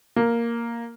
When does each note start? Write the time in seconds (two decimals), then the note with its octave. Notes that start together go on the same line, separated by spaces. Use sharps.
0.16 A#3